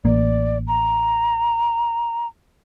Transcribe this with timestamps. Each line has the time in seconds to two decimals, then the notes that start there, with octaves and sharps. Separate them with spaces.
0.05 A1 A#3 D5
0.67 A#5